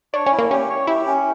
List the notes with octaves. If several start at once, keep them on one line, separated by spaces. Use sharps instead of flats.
D4 C#5
C#4
E4
A#3
C#4 G4
C#5
E4 G4
C#4